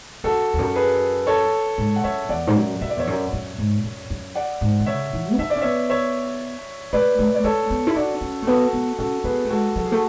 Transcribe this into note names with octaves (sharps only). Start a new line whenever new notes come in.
F#2 F#4 A4
E2
F#2
G#4 B4
A4 C#5
G#2
F#5
F#2 C#5 E5
E2 D5 F#5
G#2
F#2
F#2 E5
D5
E2 C#5 E5
F#2
F#2
G#2
F#2
F#2
D5 F#5
G#2
D3
C#3 C#5 E5
E3
C#4
D4 E5
D5
C#4
B3 C#5 E5
C#5 E5
A3 B4 D5
A3
D5
A3 A4 C#5
B3
E4
D4 F#4
C#4
A3
B3 F#4 A4
B3
C#4 F#4 A4
B3 G#4 B4
A3
G#3 F#4 A4
F#3 A4
G#4
A3 F#4